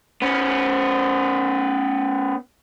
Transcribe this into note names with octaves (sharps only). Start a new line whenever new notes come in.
B3 C#4